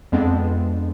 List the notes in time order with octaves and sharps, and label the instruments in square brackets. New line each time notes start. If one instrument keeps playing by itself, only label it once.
[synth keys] F2 G#3 B3 C4 D4